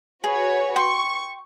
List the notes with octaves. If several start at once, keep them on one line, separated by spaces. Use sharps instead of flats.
F#4 G#4 B4 C#5
G5 C6 C#6